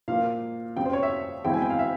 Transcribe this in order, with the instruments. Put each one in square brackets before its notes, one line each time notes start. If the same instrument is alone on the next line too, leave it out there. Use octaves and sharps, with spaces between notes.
[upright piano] A#2 F3 A#3 F5
F2 C#3 G3 G5
C5
C#5
E5
E2 E3 G#3 C4 E4 G5
G#5
G5
F5
E5